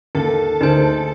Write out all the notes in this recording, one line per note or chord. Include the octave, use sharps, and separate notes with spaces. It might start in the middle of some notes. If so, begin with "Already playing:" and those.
D#2 A4
D2 D#4 G#4 A#4 C5